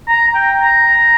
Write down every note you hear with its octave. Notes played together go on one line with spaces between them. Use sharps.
A#5
G5
A#5